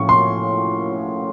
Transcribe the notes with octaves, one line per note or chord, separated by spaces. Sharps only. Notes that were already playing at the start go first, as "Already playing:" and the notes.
Already playing: A2 F3 A3 C#4 C#6
C6